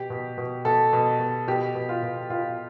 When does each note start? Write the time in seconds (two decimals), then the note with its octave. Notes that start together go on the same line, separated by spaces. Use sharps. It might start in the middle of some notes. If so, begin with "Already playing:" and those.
Already playing: B2 G4
0.10 B2
0.38 B2
0.65 B2 A4
0.93 B2
1.20 B2
1.47 B2 G4
1.75 B2
1.89 F4
2.03 B2
2.30 B2 F4